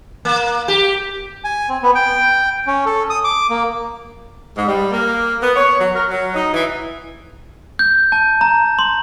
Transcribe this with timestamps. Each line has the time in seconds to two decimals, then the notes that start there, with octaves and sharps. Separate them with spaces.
0.25 A#3
0.68 G4
1.44 G#5
1.69 C4
1.83 B3
1.95 G5
2.67 C#4
2.86 A4
3.10 D#6
3.24 D6
3.50 A#3
4.56 G#2
4.67 G3
4.92 A#3
5.42 B3
5.56 C#5
5.79 F#3
5.94 A#4
6.09 F#3
6.34 D#4
6.53 E3
7.79 G6
8.12 A5
8.41 A#5
8.79 C6